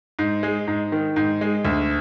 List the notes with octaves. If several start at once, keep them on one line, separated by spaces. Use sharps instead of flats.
G#2
G#3
G#2
D#3
G#2
G#3
D2